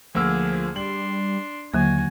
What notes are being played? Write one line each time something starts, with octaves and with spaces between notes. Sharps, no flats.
D2 F3 A#3 G#4 E6
G3 D4 C6 F#7
D#2 D3 F#3 A#3 F#4 G#5